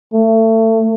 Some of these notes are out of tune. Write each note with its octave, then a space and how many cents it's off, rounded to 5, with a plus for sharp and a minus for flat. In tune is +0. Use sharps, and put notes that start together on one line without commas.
A3 +30